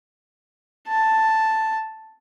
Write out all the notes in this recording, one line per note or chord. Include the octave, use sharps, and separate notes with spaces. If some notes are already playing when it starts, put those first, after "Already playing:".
A5